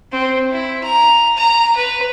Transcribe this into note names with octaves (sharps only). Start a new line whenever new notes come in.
C4
E4
A#5
A#5
B4